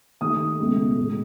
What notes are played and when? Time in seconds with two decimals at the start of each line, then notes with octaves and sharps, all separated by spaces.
0.21 D#2 D#3 A3 D#6
0.59 C#2 B2 A3
0.97 A2 G#3